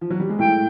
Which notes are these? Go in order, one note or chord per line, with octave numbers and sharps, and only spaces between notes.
F3
F#3
G3
G#3
A2 A3 G5